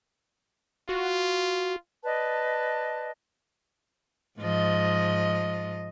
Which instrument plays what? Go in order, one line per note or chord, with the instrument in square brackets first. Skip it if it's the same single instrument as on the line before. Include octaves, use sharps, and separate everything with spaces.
[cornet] F4 [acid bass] F#4
[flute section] B4 D5 D#5 A5
[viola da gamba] G#2 F3 D#5